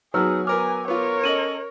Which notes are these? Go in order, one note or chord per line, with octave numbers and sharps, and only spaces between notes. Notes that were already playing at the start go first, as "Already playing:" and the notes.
F#3 B3 D#4 F#4 G#4 E6 F6
B3 A#4 G#5 D6 F6
B3 F4 A#4 C#5
C#4 A4 D#5 D#7 F#7